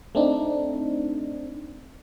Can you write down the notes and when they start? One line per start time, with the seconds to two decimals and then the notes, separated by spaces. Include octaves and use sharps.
0.15 A3 C4 D4 D#4